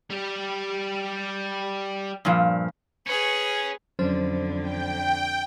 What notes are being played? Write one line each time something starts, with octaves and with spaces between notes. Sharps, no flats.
G3 G4
G2 A#2 F3
C#4 G#4 B4
F2 D3 F#3 C#4 C5
G5